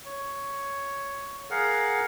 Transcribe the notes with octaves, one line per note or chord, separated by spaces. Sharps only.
C#5
G#4 A#4 F5 F#5